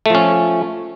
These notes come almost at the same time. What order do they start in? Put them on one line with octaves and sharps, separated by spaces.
A3 F3 C#4